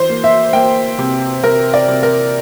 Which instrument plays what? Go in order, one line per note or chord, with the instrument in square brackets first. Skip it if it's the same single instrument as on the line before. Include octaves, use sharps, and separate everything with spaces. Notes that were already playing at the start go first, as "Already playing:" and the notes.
Already playing: [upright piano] E3 C5
A#3
E5
A#3 G5
C3
C3 A#4
D5
C3
A#4